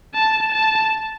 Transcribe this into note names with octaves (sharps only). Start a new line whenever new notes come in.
A5
A5